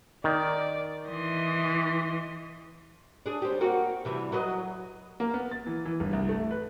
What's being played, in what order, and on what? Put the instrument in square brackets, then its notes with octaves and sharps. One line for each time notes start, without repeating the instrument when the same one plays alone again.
[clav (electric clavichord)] D#3 [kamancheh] D5
[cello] E3 [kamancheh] D#5 C6
[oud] D4 G#4
G3 C4
A#3 C4 F#4
C3 E3 G3
F#3 B4 D#5
[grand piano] A#3
B3
A6
E3
E3
G1
C2
A3
B4